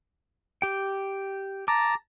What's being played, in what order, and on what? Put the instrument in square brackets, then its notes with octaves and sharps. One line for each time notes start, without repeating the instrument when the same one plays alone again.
[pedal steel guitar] G4 G5
[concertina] A5 A#5 [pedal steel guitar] D6